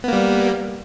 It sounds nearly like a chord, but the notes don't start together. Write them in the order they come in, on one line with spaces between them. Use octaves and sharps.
B3 A#3 G3